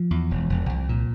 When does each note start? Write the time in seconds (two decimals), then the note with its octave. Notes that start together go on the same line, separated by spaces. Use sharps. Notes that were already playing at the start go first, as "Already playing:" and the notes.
Already playing: F3
0.11 E2
0.31 E1
0.50 E1
0.69 C2
0.89 A#2